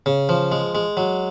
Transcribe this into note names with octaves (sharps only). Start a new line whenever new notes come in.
C#3
F3
G#3
G#3
F#3